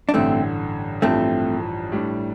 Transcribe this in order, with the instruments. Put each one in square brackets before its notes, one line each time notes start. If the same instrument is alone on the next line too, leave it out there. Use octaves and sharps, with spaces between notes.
[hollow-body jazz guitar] D4
[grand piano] A1 G2 D3 [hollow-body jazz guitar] A3 C4
[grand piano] A1 G2 F3 [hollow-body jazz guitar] A3 C4
[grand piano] A2 G3 D4